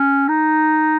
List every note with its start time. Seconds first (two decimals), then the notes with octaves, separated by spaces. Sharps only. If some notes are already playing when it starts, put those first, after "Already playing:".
Already playing: C#4
0.29 D#4